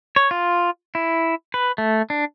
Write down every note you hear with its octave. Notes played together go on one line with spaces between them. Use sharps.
C#5
F4
E4
B4
A3
D4